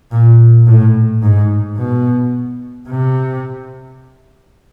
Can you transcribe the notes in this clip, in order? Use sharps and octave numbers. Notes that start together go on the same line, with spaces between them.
A#2
A2
G#2
B2
C3